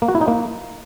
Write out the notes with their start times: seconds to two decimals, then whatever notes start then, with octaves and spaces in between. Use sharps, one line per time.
0.02 A#3
0.08 F#4
0.15 E4
0.21 D#4
0.28 A#3